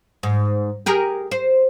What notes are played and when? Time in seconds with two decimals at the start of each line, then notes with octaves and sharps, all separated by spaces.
0.23 G#2
0.86 G4 G#4 A#4
1.31 C5